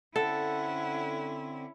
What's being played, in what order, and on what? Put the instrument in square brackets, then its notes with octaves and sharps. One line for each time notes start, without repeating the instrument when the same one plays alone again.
[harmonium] D3 C4 [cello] C#4 E4 [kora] A4 [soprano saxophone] F#5